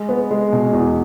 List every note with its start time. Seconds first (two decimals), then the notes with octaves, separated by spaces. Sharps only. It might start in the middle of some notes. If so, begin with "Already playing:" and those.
Already playing: G#3
0.09 B3
0.31 G#3
0.52 B2
0.73 E2